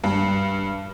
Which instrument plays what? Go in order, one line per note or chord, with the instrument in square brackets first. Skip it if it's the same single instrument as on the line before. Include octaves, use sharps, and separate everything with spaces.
[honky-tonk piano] G2